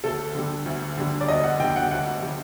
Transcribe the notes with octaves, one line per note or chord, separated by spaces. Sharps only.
D2 A4
D3 G3
D2
D3 G3
D5
D2 D#5
F#5
D3 G3 G5
G5
F#5
D2 F#5
D3 G3